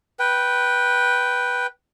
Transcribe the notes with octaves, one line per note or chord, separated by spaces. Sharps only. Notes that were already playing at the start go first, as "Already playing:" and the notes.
B4 G5